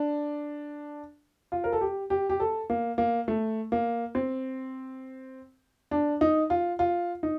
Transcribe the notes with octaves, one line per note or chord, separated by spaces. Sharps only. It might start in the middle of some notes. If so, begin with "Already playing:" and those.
Already playing: D4
F4
A#4
A4
G4
G4
G4
A4
A#3
A#3
A3
A#3
C4
D4
D#4
F4
F4
D#4